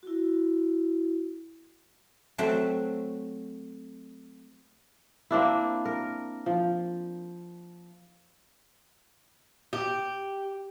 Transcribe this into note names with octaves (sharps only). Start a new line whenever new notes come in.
E4 F#4
F#3 A3 C4 F#4 A4 E5
A#3 C4 D4 E4
A#4
F3
G4